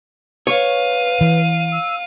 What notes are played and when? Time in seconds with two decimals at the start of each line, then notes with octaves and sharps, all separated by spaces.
0.47 B4 C#5 F5 D#7
1.21 E3
1.72 E6